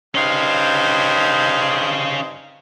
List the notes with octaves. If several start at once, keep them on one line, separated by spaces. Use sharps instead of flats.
G2 C#4 D#4 C5 F5